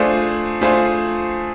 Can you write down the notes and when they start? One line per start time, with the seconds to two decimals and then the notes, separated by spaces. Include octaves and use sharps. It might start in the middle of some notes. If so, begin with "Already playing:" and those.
Already playing: A3 D4 F4 G#4 C5
0.61 A3 D4 F4 G#4 C5